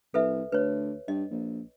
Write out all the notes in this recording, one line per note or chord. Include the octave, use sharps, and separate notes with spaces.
C2 A4 B4 E5
D2 B4 C#5
G2 D#5
A#1